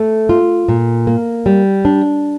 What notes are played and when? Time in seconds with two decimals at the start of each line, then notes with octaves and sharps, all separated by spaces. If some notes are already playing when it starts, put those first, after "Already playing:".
Already playing: A3
0.29 F4
0.68 A#2
1.07 A#3
1.46 G3
1.85 D4